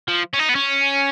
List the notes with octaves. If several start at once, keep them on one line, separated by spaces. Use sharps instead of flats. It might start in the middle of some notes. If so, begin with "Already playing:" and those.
F3
C#4
D#4
B3
C#4